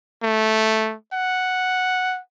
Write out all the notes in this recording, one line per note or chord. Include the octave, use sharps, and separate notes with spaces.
A3
F#5